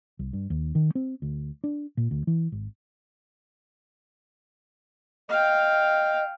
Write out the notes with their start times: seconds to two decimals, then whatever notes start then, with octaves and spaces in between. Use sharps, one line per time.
0.19 C2
0.33 G2
0.50 D#2
0.75 D#3
0.95 C4
1.22 D2
1.64 D4
1.97 A#2
2.11 D2
2.27 E3
2.52 G#1
5.29 D#5 F5 G5